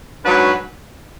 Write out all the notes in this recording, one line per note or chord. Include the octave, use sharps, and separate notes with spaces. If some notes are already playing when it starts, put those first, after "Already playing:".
G#2 F#3 D4 F#4 B4